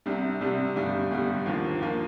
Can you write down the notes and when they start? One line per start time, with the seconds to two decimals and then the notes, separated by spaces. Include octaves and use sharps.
0.06 C2 C3 G3 D4
0.41 C2 C3 G3 D4
0.76 G1 G2 D3 G3
1.11 G1 G2 D3 G3
1.46 D#2 D3 F3 A#3
1.81 D#2 D3 F3 A#3